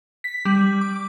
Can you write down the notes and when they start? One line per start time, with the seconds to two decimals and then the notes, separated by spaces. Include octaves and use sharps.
0.24 B6
0.45 G3
0.81 D6